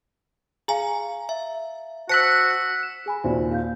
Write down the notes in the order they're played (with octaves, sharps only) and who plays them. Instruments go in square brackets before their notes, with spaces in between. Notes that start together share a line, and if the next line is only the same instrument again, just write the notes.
[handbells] G#4 G#5 [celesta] F5 A#5
[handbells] E5
[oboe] F#4 [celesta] C5 F#6 [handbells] A5 [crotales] E6 B6 C#7
[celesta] E7
G#4 G#5 B5
[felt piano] D#2 A#2 [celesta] F#4 C5 E5
[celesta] G4 F5 G6